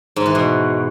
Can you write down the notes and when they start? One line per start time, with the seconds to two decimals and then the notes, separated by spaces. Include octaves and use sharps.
0.16 G#2
0.26 E3
0.35 B2